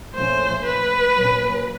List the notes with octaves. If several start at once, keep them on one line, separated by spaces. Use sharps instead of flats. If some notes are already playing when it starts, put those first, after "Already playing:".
A#2 F3 A3 C#4 C5
B4
A#2 F#3 A#3 C#4